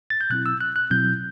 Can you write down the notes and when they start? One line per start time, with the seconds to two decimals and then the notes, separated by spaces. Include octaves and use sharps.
0.10 A6
0.21 G6
0.30 B2 F#3 C4 E4 F#6
0.46 E6
0.61 F#6
0.76 F#6
0.90 B2 F#3 C4 E4 G6